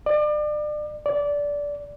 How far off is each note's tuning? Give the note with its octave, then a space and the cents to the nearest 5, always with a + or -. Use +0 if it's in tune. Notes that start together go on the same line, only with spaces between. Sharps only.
D5 +35
D5 -15